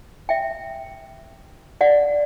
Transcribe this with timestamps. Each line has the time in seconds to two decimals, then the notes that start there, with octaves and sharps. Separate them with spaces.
0.29 E5 G5
1.81 D5 F#5